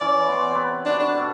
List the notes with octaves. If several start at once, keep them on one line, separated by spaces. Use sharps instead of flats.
E3 C#4 E4 D5
B3 C6
C3 B4
D4 F#4 G4
D4
B2 A4